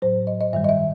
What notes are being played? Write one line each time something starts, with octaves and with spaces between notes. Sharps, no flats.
A2 F#3 C5
D#5
D#5
G2 D#3 G3 E5
D#5
E5